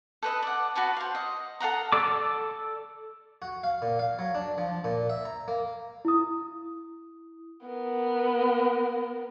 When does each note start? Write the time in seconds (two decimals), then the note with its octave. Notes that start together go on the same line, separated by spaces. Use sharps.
0.23 A4 B4 D#5
0.43 D5 F#5
0.75 F#4 B4 A5 C#6
0.96 C5 F5
1.15 D#5
1.60 A4 F5 F#5 A#5
1.92 A4 D5 D6
3.42 F#4
3.63 F5
3.82 A#2
3.99 F5
4.19 F#3
4.35 D4
4.58 F3
4.84 A#2
5.10 E5
5.25 A#5
5.48 A#3
6.05 E4 D#6
7.67 B3 A#4